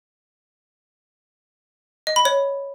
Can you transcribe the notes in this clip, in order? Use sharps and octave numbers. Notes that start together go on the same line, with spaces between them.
D#5
B5
C#5